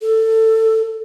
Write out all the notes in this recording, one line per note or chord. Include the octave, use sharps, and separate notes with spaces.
A4